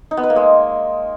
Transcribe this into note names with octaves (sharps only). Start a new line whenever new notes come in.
D#4
B3
B4
A#3
G#3